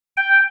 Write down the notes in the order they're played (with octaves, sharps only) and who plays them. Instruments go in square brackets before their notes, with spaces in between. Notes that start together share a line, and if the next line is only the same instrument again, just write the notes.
[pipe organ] G5